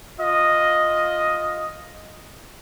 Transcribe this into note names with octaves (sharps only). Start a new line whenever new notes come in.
F4 D#5